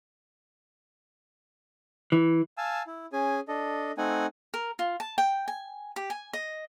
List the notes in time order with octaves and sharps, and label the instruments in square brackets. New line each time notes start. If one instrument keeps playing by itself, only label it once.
[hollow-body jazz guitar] E3
[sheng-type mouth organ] F5 G#5 A5 E6
E4
C#4 G#4 G#5
D4 A4 D#5
A3 C4 D#4 F#5 G#5
[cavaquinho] A#4
F4
A5
G5
G#5
G4
G#5
D#5